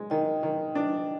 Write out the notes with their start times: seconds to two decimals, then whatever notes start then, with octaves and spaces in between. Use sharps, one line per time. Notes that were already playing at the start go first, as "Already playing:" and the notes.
Already playing: G#3
0.10 D#3 D#5 G5
0.43 D#3
0.75 D4